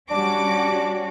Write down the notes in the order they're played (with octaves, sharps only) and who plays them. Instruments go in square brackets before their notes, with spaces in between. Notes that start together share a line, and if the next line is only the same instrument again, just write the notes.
[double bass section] G3 [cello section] C#4 F#4 [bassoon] D4 [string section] D6